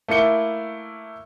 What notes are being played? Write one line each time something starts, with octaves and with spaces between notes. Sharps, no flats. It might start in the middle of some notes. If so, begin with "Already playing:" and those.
A3 A#3 E4 C#7 G7